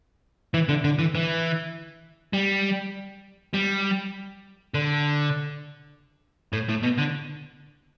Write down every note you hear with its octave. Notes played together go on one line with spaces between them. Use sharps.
E3
D3
D3
E3
E3
G3
G3
D3
A2
A2
B2
D3